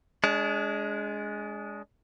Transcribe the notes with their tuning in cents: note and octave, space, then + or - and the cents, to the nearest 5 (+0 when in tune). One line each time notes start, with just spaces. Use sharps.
G#3 +5 D4 -30